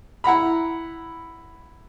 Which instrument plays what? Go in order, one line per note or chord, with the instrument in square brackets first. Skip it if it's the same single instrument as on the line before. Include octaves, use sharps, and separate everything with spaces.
[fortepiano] E4 F#5 A#5 B5